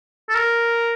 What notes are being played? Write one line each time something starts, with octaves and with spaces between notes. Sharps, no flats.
A4
A#4